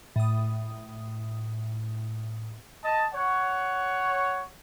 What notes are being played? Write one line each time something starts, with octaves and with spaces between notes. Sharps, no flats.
A2 D#6
D#5 A5
C#5 F#5